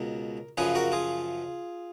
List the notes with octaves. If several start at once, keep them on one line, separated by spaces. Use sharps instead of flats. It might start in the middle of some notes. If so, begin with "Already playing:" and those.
Already playing: C#2 B2 A#4
F#2 C#3 F3 G#4 B4
F#4 A#4
F4 G#4